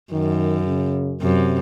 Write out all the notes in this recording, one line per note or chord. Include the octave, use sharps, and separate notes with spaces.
F#2 D#3
C#3
F#2 C3